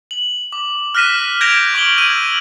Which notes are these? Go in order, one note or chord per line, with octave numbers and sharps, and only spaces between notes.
F#7
D6
F6 F#6 A#6 B6 D#7 E7
G6 G#6 A#6 D7 E7 F7
C#6 D6 D7 F#7 G7
E6 G#6 D#7